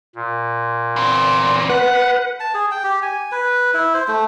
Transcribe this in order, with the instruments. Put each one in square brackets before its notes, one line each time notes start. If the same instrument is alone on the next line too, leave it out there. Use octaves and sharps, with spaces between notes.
[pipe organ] A#2
[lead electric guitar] E2 C4
[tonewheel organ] B4 [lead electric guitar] F#5
[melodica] A5
G#4
G5
G4
G#5
B4
E4
C5
A3